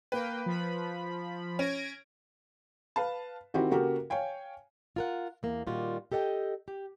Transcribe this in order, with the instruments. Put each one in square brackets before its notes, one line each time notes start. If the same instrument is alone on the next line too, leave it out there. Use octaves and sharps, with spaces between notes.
[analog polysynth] A#3 G5 [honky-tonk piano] B4
[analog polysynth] F3 B5
[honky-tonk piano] C#4 [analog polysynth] G#6 A#6 D7
[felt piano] B4 F5 A5
D#3 C4 E4 F#4 G4
C#3 A#3 F#4 G4 A4 A#4
C#5 F5 G5 G#5
[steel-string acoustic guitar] F4 A#4 F#5
E2 A#3
A#2 D#3 G3 F4 F#4
G4 A4 D#5 F#5 G5
G4